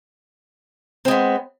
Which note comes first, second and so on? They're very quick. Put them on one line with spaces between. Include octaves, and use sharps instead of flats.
C4 G#3 B3